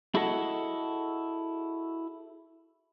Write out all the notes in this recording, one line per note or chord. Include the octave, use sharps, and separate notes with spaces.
E4 F#4 G#4 A4 D#5 F#5